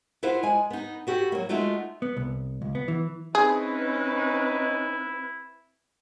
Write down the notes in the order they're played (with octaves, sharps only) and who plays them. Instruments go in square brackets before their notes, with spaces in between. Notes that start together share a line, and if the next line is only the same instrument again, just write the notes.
[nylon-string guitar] E4 F4 B4 C5 F5 F#5
G#3 G#5
B3 D#4
B3 F#4 G4 A4
F#3 A#3
G#3 A3 D#4 F4 F#4
[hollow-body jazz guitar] B3
C2
C#2
B3
E3
[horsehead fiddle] C4 B4 [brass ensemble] C#4 D#4 [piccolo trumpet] E4 [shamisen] G#4